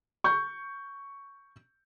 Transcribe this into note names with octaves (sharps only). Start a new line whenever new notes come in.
C#6 G6